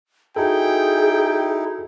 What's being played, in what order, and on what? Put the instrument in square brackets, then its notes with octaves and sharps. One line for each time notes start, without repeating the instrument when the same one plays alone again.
[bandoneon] D#4 E4 [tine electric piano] F#4 A4 [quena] G#4 [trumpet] G5